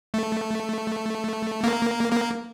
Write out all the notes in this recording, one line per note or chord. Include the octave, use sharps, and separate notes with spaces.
A3
A#3
A#3